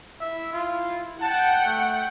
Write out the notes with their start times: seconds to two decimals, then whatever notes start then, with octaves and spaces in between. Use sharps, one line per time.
0.20 E4 E5
0.53 F4
1.21 F#5 G5 A5
1.64 A3